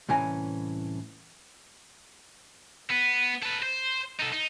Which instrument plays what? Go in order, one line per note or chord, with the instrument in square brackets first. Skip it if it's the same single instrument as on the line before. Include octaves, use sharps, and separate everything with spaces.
[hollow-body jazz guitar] C2 A2 E3 C#4 G#5 A#5
[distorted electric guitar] B3
A4 B4
C5
D#4 A4
D#4